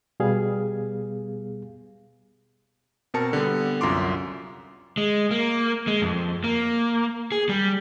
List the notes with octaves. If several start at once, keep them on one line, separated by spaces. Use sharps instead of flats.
B2 G3 B3 G#4 F5
B2 C4 A#4 A5 C#7
D3 G3 B3
C2 F#2 F4 C6 D6
G#3
A#3
G#3
F2
A#3
G#4
G3